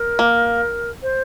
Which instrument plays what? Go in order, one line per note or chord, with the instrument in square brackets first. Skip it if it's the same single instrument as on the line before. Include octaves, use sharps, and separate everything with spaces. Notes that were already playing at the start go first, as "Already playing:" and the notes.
Already playing: [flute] A#4
[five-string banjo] A#3
[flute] C5